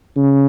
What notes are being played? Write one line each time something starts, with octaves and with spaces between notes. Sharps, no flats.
C#3